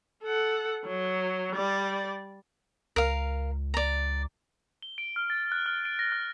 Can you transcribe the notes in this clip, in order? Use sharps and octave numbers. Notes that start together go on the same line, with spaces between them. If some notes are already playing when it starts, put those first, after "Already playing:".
A4 F#5
F#3
G3 D5
C#2 A#4 F5
D5 A#5
G7
D7
F6
A6
F#6
F6
D7
A#6
F#6